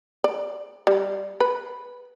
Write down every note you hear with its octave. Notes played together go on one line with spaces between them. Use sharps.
D5
G3
B4